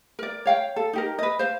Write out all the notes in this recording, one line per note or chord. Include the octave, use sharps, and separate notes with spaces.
A#4 D5
C#5 F5 G5
A4
D#4 G4 A#4
B4 D#5
C5 F5